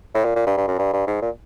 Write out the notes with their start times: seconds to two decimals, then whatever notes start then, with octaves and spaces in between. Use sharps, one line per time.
0.14 A2
0.25 A#2
0.36 A#2
0.47 G2
0.57 G2
0.68 F#2
0.79 G2
0.93 G2
1.07 G#2
1.22 A#2